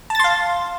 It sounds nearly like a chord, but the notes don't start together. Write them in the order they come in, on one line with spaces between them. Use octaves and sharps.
A5 A6 C6 F5